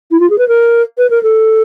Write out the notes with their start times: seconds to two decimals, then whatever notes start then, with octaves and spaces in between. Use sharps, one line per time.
0.11 E4
0.20 F4
0.30 G#4
0.38 B4
0.48 A#4
0.98 B4
1.10 A#4
1.23 A4